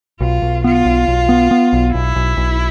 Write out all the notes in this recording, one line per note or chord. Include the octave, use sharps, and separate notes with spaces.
B1 F4
B1
B3 F4
B1
B1
B3
B3
B1
B1 E4
B1
B1